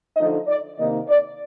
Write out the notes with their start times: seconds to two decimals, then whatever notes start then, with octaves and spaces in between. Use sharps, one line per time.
0.16 D3 F3 A3 D#4 D#5
0.47 D5
0.77 C3 D#3 A#3 D#4 D#5
1.08 D5